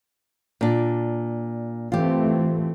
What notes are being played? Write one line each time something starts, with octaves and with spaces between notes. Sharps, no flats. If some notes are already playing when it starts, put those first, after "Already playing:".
A#2 D4
E3 A3 C4 F4 G4